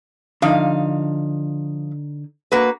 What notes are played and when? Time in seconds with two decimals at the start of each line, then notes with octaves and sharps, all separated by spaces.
0.42 D3 F3 D#4 F5
2.52 A#3 F#4 B4